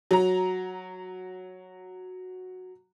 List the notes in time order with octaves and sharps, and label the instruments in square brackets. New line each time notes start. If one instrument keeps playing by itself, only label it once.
[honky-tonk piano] F#3 A#5